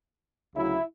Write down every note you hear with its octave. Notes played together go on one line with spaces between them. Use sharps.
D2 C#3 F#3 E4